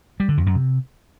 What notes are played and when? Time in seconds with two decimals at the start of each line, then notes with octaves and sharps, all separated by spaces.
0.20 G3
0.29 D3
0.37 F2
0.46 F#2
0.55 C3